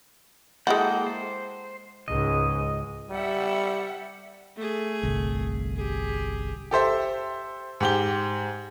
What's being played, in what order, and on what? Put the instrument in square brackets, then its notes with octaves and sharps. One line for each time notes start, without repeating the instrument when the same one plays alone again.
[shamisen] G#3 E4 F#4 [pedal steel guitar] A#3 A4 G5
[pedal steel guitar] C5
[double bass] C#2 G#2 [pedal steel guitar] D#5
[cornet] G3 [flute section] E5 F#5
[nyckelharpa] A3 G#4
[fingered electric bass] G1 C2
[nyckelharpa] G4 G#4
[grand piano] G4 A4 C5 E5
G#2 G4 G7